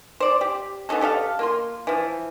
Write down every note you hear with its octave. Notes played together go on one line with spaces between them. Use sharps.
C5 D5
G4
B3 C#4 D#4 A4
G4 A4 D#5 F5
A#3 F4 C6
E3 F3